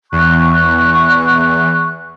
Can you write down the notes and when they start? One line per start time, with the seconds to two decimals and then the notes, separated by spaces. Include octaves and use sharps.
0.12 E2 C#6 F#6